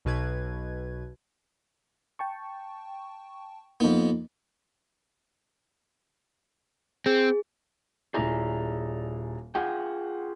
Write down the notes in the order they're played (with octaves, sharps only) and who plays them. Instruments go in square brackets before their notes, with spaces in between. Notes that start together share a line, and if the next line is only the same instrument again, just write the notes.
[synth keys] B1 B2 B4 G#6
[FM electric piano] G5 A5 C#6
[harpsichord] F2 B3 [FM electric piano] A#3 D#4
[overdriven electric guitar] C4 [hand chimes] G#4
[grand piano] D#1 E4 [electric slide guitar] G#4 D5 A#5
[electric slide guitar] F4 G#4 G5 [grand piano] F#5